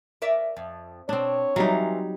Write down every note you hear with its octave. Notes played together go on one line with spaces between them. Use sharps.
A#4 D5 E5
F2
B2 C4 D4 C#5
E3 F#3 G3 D#4 F4